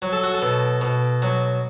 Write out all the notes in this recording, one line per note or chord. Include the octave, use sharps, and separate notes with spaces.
F#3
A4
F#4
A4
B2
B2
F#3